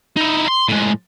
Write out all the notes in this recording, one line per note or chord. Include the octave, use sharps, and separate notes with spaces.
D#4 E4
C6
A2 G#3